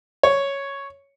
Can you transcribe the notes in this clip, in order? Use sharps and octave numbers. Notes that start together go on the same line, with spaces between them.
C#5